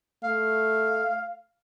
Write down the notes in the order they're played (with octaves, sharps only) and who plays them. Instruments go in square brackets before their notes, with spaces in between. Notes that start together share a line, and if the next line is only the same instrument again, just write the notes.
[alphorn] A3 [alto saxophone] F5